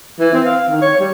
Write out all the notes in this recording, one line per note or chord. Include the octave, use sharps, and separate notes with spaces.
E3
C4
F5
D#3
C#5
G3